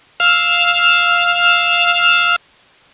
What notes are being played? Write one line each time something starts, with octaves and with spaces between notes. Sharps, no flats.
F5 E6 F6